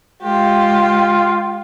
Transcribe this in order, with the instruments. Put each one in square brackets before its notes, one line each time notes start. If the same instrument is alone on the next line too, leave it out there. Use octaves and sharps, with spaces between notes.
[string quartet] G#3 G4 [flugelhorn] F4